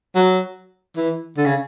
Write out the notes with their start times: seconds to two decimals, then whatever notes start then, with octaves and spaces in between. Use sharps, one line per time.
0.15 F#3
0.97 E3
1.37 D3
1.46 C#3